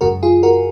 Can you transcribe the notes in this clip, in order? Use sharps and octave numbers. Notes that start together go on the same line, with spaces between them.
F#2 C#3 G#3 F#4 A#4
F4 G#4
F#4 A#4